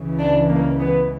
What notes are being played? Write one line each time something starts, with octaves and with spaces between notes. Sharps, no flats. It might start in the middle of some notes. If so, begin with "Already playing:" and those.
Already playing: C#2 C#3 E3
D4
A#3
B3